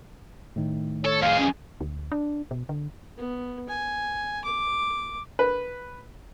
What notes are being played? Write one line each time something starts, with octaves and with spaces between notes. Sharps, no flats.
A2 D#3
A4 C#5
F2 G#4 F5
C#4
D2
D4
B2
D3
B3
G#5
D6
B4